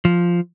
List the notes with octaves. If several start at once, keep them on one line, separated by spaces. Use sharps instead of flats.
F3